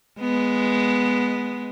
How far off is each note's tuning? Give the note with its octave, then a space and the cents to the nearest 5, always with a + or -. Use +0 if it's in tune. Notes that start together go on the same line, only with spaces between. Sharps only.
G#3 +0 B3 +0